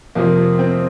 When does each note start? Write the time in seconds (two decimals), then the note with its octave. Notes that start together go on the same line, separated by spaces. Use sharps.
0.15 F2 C3 F3 A#3
0.59 C4